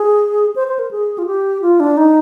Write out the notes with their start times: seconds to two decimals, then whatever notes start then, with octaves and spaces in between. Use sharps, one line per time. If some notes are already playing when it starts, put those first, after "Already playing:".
Already playing: G#4
0.56 C5
0.67 C5
0.79 A#4
0.91 G#4
1.18 F4
1.26 G4
1.62 F4
1.80 D4
1.97 D#4